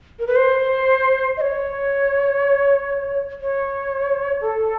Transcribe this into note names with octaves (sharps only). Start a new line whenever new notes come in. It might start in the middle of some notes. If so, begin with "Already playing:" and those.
A#4
B4
C5
D#5
C#5
C#5
A4